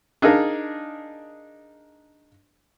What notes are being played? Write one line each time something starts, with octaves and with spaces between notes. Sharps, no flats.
D4 D#4 G#4 A#4 F5